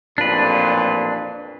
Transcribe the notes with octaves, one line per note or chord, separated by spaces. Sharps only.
A1 F2 A#2 D4 B4